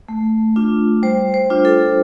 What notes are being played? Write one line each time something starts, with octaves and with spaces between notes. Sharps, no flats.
A3
D4 F4
G3 C5
C5
D4 F4
A4